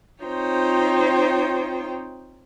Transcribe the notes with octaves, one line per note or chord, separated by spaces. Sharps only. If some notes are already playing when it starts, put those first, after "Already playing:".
C4 D#4 F4 C5 C#5 G5